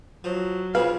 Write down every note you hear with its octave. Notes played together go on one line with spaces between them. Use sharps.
F3 F#3
B1 B2 F3 F4 G#4 B4 F5